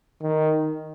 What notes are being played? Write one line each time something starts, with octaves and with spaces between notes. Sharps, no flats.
D#3